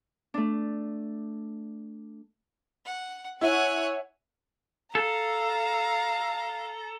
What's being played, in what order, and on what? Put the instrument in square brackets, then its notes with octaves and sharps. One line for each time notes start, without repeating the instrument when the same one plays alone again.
[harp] A3 D4
[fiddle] F#5
[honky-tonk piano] E4 [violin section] C#5 F#5 [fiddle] G#5 F#6
[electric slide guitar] A4 [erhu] F5 [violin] A#5